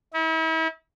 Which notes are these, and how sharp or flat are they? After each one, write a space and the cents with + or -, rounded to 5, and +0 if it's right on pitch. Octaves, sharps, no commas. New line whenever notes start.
E4 -40